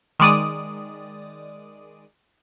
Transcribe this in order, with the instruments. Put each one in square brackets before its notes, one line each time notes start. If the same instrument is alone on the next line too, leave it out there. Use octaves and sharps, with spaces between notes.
[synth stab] D#3 G#3 D5 D#6